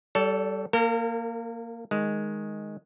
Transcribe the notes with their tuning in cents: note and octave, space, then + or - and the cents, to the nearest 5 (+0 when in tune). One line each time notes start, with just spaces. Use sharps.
G3 -15 A4 +0 C#5 +40
A#3 -5 A#4 -40
D#3 +0 G#3 +0